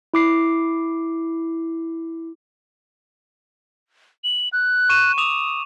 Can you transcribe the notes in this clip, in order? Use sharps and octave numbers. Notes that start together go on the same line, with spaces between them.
E4 D6 C7
F#7
F#6
C#6 D#7 E7
D6 D#6 E7 F7